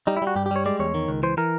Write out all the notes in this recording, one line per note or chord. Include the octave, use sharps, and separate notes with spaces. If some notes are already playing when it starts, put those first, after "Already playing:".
G3 D#4
E4
G3
F#4
G2 G4
G4
G3 C#5
G#3 D5
E2 C#5
D#3
C#2
E3 C5
E3 A#4